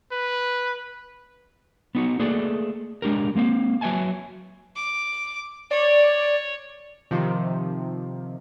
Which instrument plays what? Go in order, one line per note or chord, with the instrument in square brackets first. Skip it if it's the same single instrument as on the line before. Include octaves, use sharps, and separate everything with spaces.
[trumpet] B4
[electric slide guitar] B3 D#4 F#4
A3 A#3 G#4 A4 B4 D5
G#3 D4 G4 A#4
G#3 A#3 C4 F5
F#3 B4 E5 G#5 A5
[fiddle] D6
[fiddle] C#5 [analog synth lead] D5
[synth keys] C3 D#3 F3